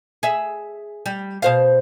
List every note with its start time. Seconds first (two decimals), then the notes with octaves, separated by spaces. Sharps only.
0.23 G#4 E5
1.06 G3
1.42 B2 C5 F5